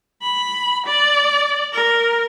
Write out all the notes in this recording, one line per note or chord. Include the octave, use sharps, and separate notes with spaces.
B5
D5
A#4